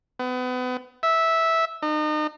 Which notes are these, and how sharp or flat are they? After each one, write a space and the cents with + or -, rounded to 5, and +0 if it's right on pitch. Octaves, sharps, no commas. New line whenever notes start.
B3 +35
E5 -10
D#4 -35